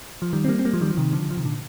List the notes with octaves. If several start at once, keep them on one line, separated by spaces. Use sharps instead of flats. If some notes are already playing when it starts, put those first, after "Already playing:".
F3
D#3 G3
C4
G3 A#3
C4
G3 A#3
F3 G#3
D#3 G3
F3
C3 D#3
D3 F3
F3
C3 D#3
A#2 D3